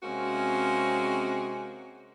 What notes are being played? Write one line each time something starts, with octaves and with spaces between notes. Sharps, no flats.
C3 G#3 A#3 C4 C#4 F#4